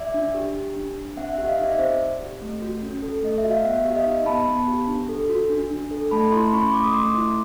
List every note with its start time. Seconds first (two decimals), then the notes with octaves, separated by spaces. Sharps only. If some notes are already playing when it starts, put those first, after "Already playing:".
Already playing: D5 E5
0.14 D4
0.34 G4
0.55 G4
0.76 D4
0.97 D4
1.17 C4 E5 F#5
1.33 E5 F#5
1.38 G4
1.48 D#5 F5
1.59 D#4 D5 E5
1.79 C4 C5 D5
2.00 C4
2.20 G4
2.41 A3
2.62 F#4
2.83 C#4
3.02 A4
3.23 A3 D#5
3.38 E5
3.43 F#4
3.51 F5
3.64 B3 E5 F#5
3.85 G4 E5
3.95 D#5 F5
4.06 D#4
4.26 B3 A5 B5
4.47 B3
4.68 G4
4.88 D4
5.09 A4
5.30 F#4
5.50 D4
5.71 D4
5.91 A4
6.11 A3 A5 B5
6.32 E4 A#5 C6
6.47 C6
6.53 C#4 B5 C#6
6.73 A3 D6
6.84 D#6
6.93 A3 C6 D6
7.14 E4